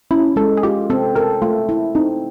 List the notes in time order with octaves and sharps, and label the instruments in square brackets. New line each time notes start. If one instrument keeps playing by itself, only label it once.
[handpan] C#4 [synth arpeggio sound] E4
[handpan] G#3 [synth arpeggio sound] A4
[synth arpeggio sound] G#4
[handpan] F4 [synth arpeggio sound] G4
[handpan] C4 [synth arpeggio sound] A4
[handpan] A4 [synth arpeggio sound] A#4
[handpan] A3 [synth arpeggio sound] F4
[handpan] E4
[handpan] C4 [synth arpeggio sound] D#4